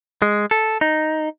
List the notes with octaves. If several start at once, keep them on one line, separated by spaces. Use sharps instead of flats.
G#3
A4
D#4